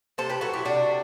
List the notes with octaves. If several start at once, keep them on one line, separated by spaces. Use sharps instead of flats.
C3 A4 C5
G4 B4
F#3 F#4 A4
E4 G4
C3 D4 F#4